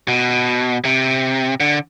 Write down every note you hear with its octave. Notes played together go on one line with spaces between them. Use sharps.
B2
C3
D3